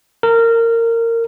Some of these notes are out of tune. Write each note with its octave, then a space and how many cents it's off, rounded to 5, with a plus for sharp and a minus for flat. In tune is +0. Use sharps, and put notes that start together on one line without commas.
A#4 -20